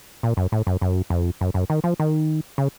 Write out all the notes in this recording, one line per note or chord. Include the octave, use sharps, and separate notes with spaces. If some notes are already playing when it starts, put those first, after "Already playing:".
A#2
F#2
A2
F#2
F#2
F2
F#2
F#2
D#3
F3
D#3
C#3